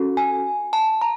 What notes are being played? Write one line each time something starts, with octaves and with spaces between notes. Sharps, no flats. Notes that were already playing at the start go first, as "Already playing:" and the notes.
Already playing: C#4 F#4 A4
G#5
A5
A#5